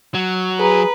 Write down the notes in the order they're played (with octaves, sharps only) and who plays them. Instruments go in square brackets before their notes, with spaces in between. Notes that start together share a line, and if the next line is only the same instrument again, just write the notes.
[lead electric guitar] F#3
[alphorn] G#4 [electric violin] B4 [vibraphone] A#5